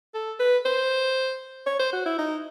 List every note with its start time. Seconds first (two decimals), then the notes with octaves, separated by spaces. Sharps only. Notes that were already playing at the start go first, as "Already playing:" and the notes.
0.15 A4
0.40 B4
0.66 C5
1.67 C#5
1.79 C5
1.93 F#4
2.06 E4
2.18 D#4